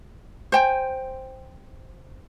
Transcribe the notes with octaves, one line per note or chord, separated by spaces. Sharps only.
C5 G5 G#5